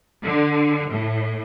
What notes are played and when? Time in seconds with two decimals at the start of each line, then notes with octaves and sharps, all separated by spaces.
0.23 D3
0.90 A2